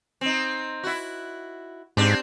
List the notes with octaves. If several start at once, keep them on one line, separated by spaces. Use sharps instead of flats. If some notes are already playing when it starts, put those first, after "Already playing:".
C4 D#4
E4 F#4
G#2 C4 D4 G4